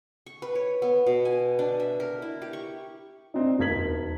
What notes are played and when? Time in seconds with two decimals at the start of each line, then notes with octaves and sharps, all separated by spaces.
0.26 C#6
0.42 B4
0.55 C#5
0.82 B3
1.06 B2
1.25 G#5
1.59 D4
1.80 E5
2.00 A#4
2.22 E4
2.42 G4
2.53 C#6
3.34 C4 D4 D#4
3.59 E1 D#2 A#4 G#6 B6 F#7